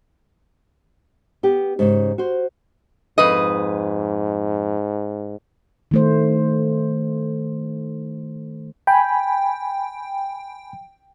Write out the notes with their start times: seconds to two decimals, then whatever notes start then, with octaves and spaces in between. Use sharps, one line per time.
1.43 B3 G4
1.79 G#2 C#3
2.18 F#4 C5
3.18 F2 G#2 B4 D#5
5.91 D#3 A3 C5
8.87 G5 G#5 B5